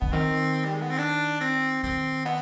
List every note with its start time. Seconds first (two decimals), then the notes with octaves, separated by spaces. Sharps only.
0.01 D3 B3
0.12 D#3 C4
0.64 G3
0.73 G#3
0.82 B3
0.90 C4
0.98 D4
1.40 C4
1.83 D#3 C4
2.25 B3